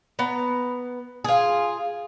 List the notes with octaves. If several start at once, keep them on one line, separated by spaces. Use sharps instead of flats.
B3 A#5
F4 G#4